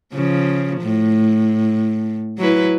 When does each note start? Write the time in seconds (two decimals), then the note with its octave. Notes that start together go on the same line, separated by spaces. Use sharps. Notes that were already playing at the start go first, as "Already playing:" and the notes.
0.13 C#3 F3
0.81 A2
2.38 F#3 E4 B4